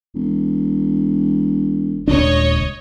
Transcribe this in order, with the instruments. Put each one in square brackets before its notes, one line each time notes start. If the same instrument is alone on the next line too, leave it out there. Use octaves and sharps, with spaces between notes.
[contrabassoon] E1
[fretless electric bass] D#1 C#2 D4 [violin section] C#5 D#5